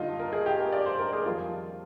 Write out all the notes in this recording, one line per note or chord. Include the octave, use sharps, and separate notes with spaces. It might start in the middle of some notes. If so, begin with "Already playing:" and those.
Already playing: G2 D3 G3 D#4 F4
A#4
G#4
G4
A#4
D5
C5
A#4
G#4
F2 D#3 G3 F4